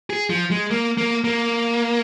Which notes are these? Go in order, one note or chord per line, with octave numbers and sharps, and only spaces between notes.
G#4
F3
G#3
A#3
A#3
A#3